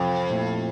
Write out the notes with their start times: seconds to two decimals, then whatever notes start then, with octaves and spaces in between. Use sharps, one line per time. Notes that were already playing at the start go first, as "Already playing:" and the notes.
Already playing: C2 F2 C3 E3
0.30 A#2 A3 E4 G4